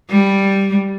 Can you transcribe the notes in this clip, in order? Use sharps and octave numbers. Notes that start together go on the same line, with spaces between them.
G3